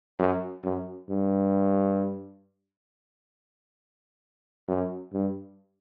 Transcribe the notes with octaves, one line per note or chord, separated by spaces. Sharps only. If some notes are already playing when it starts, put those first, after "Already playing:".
F#2
F#2
G2
F#2
G2